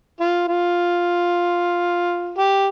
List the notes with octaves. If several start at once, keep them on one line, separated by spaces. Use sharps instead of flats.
F4
F4
G4